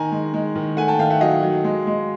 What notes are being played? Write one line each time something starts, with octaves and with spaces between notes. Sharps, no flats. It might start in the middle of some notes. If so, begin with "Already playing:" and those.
Already playing: D#3 G#5 A#5
G#3
G#3
D#3
A3 F#5 G#5
G5 A5
D#3 F5 G5
E5 F#5
F#3 D#5 F5
F#3
G#3
G#3